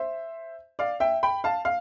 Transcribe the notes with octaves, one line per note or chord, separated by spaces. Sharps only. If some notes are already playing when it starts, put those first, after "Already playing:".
Already playing: C5 E5
D5 F5
E5 G5
G5 B5
F5 A5
F5